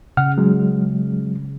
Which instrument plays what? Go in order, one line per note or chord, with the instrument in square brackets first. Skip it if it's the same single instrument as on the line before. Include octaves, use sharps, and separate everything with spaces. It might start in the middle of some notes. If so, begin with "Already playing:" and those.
[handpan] C#3 [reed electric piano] F#5 F6
[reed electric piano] F#3 G#3